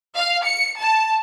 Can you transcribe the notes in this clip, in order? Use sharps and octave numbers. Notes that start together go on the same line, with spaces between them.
F5
C#7
A5